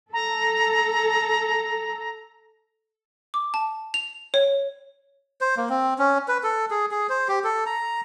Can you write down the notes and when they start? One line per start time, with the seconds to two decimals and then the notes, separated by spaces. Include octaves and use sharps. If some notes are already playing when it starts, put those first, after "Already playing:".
0.13 A4 A#5
3.34 D6
3.54 A5
3.94 F7
4.34 C#5
5.41 C5
5.57 A#3
5.70 C4
5.99 C#4
6.28 B4
6.43 A4
6.71 G#4
6.91 G#4
7.09 C5
7.28 G4
7.44 A4
7.66 A#5